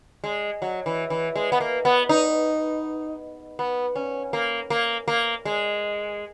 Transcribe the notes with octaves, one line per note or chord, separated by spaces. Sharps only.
G#3
F#3
E3
E3
G#3
B3
A#3
B3
D#4
B3
C#4
A#3
A#3
A#3
G#3